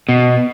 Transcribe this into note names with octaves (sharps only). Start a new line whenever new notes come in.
B2